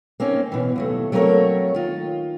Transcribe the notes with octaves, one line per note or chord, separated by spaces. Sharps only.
A#3 C4 C#4 D#4
B2 E3
D#2 F#3 A3
F#3 A3 A#3 C4 A#4 C#5
D#3 F4